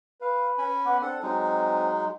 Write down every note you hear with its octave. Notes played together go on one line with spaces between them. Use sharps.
B4 F5
C#4 G#5 B5
B3 F#5 D6
C4 D4 A4 F#5
F#3 G#3 C4 D#4